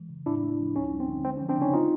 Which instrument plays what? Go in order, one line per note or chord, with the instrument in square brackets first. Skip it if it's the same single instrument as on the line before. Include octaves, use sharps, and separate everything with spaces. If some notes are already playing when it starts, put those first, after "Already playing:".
Already playing: [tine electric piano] E3 G#3
C#3
A2 D4 E4
A3
F3
D2 C#4 D#4
G3
C4
D3
G#3 C4
C#4
F3
C4 D4
C#3 C#4 D#4
D#4 F4